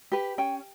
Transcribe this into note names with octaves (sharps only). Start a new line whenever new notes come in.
G4 B4
C#4 G5